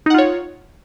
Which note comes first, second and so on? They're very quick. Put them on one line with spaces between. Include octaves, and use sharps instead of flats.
D#4 F#5 F4 C#5